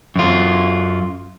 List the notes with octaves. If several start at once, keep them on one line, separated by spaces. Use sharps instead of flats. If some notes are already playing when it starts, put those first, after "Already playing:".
F#2 F4